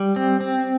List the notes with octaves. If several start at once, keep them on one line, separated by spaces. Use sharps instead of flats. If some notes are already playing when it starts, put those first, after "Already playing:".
Already playing: G3
C4
C4